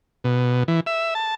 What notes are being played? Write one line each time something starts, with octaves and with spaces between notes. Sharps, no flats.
B2
E3
E5
A5